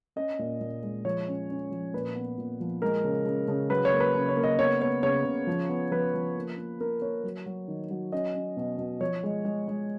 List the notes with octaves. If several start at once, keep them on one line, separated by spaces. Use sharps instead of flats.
C#4 D#5
A#2
A#2
G#3
F3 C#5
C#4
C#4
F3
A#2 B4
B3
A#2
F3
G#3 A#4
C#3
C#3
C#3
F#3 B4
C#5
A#3
B4
C#3
C#5
A#3
D#5
B3 C#5
B3 C#5
C#3 C#5
C#3
F3
B3
F3 B4
F3
A#3
A#3
A#3 A#4
A#3 C#5
F#3
F#3
D#3
F#3
C#4 D#5
C#4
B2
B2
F3 C#5
G#3
G#3
G#3